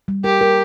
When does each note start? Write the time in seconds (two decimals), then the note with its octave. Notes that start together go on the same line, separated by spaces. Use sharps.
0.08 G3
0.24 G4 A#4
0.41 A#4